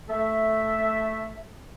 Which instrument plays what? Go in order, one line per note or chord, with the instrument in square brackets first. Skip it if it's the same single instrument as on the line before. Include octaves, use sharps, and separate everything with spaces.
[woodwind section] A3 A4 E5